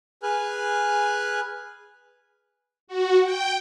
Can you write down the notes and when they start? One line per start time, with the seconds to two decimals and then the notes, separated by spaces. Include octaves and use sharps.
0.23 G#4 B4 G#5 F6 F#6
2.87 F#4
3.23 G5